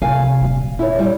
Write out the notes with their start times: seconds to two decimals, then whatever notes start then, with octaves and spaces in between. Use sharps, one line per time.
0.02 C3 F5 G#5
0.42 D#1 D3
0.79 E4 C#5
0.99 G3